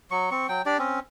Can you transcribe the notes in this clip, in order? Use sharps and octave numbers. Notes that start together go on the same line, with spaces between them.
F#3 C#6
C4 C#6
F#3 G5
D4 G4 D5
C4 C#4